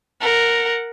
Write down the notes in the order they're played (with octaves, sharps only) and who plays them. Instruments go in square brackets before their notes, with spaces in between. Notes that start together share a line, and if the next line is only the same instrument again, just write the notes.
[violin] A#4 F#5